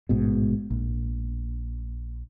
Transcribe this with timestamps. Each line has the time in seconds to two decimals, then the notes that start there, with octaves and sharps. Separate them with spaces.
0.09 A1 G#2 B2
0.70 A#1